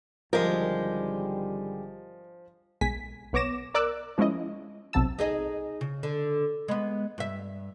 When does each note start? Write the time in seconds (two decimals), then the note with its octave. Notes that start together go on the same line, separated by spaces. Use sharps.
0.33 G#1 D3 F3 G3 G#3 G4 A#4
2.81 B1 G#3 G#5 B6
3.33 B1 B3 C#5 D6 A#6 E7
3.74 A#4 D5 D6 E6 F#6
4.18 F3 G#3 C#4 E4 D#5
4.93 B1 C3 F#3 A5 E6
5.19 D#4 G#4 D#5
5.81 C#3
6.03 D3
6.68 G#3 B3
7.18 G2 E5